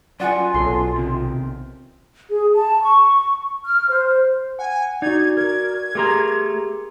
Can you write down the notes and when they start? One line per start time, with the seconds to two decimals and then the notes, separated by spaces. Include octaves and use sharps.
0.20 F#2 F4 D5 F#5 G#5
0.54 B1 B2 C#4 A4 C6
0.96 C3 D#3
2.29 G#4
2.55 A5
2.83 C#6
3.65 F6
3.88 C5
4.59 F#5 G#5
5.02 D#4 F#4 D5 G#6
5.37 A#4 G#6
5.95 A3 G4 G#4 A#4 A#5 C6